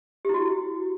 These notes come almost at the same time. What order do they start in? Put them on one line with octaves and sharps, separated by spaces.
G4 E4 F#4